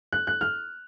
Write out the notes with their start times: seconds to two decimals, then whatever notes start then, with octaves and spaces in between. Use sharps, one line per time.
0.12 F#6
0.27 F#6
0.41 F6